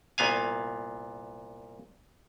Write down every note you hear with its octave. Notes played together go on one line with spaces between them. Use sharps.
C2 A#2 B3 F5 G#5